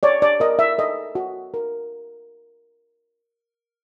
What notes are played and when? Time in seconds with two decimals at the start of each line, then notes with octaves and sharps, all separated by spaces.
0.03 C#5 D5
0.22 D5
0.40 A#4 D#5
0.59 E5
0.78 A4 D#5
1.15 F#4
1.54 A#4